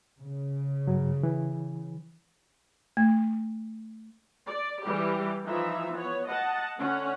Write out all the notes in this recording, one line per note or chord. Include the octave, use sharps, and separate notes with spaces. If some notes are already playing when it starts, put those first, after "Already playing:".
C#3
G2 F#3
E3
A3
D5
E3 G3 G4
E3 F3 D#4 E5
B3 C#5
D#5 F#5 A5
D3 C#4 F#5